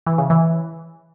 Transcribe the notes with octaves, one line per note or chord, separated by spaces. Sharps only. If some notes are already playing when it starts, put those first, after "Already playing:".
E3
C#3
E3